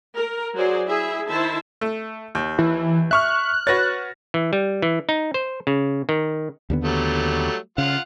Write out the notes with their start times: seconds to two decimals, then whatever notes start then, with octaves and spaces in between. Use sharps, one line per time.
0.15 A#4
0.55 F#3 F#4 G#4 C5 D5
0.87 E4 G#4 E5
1.28 D#3 E4 C5 E5 A5
1.81 A3
2.35 D#2
2.59 E3
3.11 E5 C#6 F6 F#6
3.67 F#4 B4 C#5 A6 A#6
4.34 E3
4.53 G3
4.82 E3
5.09 D#4
5.34 C5
5.67 C#3
6.09 D#3
6.70 D#2 D3 B3
6.84 F#3 G3 A3
7.78 C#3 F4 F5 F#5